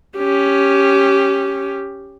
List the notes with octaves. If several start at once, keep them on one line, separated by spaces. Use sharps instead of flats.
C#4 G4